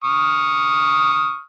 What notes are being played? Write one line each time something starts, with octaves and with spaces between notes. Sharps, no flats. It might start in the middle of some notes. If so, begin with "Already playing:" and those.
C#6 D#6 F6